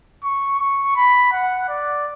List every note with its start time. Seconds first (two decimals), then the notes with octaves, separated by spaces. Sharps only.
0.23 C#6
0.59 C#6
0.96 B5
1.32 F#5
1.68 D5